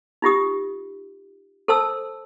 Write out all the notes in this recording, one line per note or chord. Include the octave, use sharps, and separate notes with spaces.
D#4 F4 G4 D#6
A4 C5 A5 E6